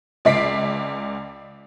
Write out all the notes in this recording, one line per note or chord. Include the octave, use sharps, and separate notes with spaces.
C#2 D5 B6 C7 D7